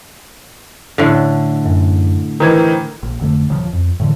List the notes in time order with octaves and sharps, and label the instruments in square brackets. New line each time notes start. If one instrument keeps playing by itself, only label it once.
[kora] A2 D3
[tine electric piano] F#2
[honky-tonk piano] D#3 E3 [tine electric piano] A#4 C5 G#6
[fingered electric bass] A#1
F1 D3 A3
D#1 C#3 F3
F2
A2 D3 E3